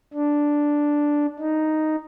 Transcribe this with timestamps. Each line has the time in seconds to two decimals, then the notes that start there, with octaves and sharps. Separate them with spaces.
0.14 D4
1.39 D#4